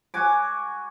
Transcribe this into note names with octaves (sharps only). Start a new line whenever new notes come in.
F#4 G#5 D6